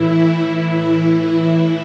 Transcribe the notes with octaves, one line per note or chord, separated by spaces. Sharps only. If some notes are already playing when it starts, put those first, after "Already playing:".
Already playing: A2 E3 E4
E4